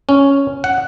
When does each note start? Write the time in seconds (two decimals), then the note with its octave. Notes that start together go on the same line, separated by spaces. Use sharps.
0.09 C#4
0.64 F#5